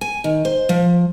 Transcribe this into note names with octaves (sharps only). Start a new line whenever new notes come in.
G#5
D#3
C5
F3